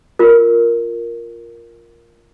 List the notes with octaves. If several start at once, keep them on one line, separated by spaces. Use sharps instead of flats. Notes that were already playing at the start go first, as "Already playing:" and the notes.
F4 A#4